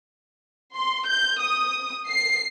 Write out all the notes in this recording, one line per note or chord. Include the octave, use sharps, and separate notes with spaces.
C6
G6
D#6
C7